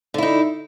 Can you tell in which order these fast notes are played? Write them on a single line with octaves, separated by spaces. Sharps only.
D3 E4 D#4